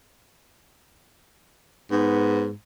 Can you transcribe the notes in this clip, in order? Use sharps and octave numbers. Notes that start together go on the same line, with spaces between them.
G#2 B3